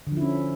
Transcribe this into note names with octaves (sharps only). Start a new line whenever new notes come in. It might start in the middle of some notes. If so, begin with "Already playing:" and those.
D3
F3
E4
C#4